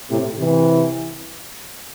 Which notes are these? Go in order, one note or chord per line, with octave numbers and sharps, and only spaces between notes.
A2 C3
C3 E3